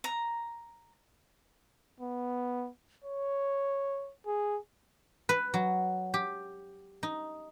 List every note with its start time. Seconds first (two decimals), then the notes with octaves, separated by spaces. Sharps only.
0.04 A#5
2.00 B3
3.04 C#5
4.27 G#4
5.29 B4
5.54 F#3
6.14 G4
7.03 D#4